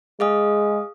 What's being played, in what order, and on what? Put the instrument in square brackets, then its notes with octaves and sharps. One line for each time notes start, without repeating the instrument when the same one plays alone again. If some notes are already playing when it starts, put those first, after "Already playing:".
[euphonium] G#3 [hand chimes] G#4 F5 D#6